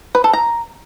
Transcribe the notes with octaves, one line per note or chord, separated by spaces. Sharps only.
B4
A4
A#5